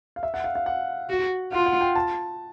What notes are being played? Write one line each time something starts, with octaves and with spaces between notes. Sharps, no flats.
F5
E5
F#5
F5
F5
F#5
F#4
F4 F#5
F#5
G5
A5